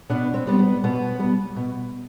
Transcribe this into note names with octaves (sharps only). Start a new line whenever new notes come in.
B2 B3 D4
C4
G3 B3
B3
B2 B3
G3 B3
B2